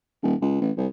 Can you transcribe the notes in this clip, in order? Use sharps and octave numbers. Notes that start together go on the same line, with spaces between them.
D#1
C#2
A1
C2